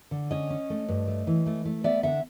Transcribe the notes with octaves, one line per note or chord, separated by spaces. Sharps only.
D3
C#4 C#5 D#5
C#4
A3
G2
A3
E3
A3
A3
B3 D5 E5
D3 E5 F#5